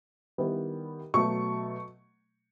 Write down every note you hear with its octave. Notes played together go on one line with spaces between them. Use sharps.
D#3 G3 B3 E4
B2 F#3 A3 C#6